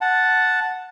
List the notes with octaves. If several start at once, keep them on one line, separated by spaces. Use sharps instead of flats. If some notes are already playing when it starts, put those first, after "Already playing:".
F#5 A5